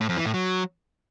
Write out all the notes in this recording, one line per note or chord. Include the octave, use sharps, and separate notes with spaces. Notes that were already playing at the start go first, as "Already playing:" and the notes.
A2
F2
E3
A2
F#3